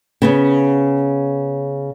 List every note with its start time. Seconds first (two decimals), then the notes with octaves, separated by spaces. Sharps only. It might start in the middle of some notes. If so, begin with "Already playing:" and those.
0.22 C#3 B3 C#4